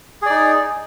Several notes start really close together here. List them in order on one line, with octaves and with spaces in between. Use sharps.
G#4 D5 D#4